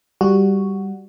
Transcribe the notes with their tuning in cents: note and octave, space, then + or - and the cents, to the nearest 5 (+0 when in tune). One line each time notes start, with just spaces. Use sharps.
G3 +0 F#4 +0